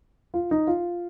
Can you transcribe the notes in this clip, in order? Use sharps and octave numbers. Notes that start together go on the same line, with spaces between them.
F4
D#4
F4